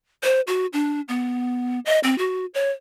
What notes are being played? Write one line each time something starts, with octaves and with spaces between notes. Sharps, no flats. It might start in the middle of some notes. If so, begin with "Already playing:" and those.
C5
F#4
D4
B3
D#5
C4
F#4
C#5